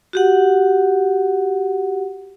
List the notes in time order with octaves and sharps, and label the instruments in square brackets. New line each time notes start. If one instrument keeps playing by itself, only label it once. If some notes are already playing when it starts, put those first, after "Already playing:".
[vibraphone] F#4 G4 F#5